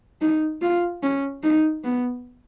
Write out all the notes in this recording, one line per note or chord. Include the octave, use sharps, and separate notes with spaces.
D#4
F4
C#4
D#4
B3